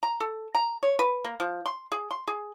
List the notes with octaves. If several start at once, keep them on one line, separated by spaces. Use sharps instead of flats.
A#5
A4
A#5
C#5
B4
A#3
F3
C6
G#4
C6
G#4